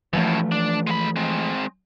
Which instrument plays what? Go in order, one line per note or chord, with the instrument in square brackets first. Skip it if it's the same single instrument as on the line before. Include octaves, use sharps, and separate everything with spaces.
[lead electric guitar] F#2 A2 [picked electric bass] E3 F3 A3
[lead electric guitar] D4
G#3 B5
G#3 C4